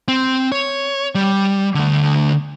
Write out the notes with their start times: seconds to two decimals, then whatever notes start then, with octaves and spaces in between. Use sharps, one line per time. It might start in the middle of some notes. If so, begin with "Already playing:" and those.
0.08 C4
0.52 C#5
1.15 G3
1.75 D3 A3